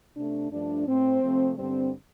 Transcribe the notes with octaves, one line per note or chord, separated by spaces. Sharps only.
C3 A3 D4
G2 F3 A3 D4
A2 A3 C4
C3 F3 A3
G2 D3 G3 C4